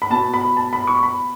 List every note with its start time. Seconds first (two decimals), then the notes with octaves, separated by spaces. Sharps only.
0.02 B5
0.10 B2 A5
0.34 B5
0.57 A5
0.73 B5
0.87 C#6
1.03 B5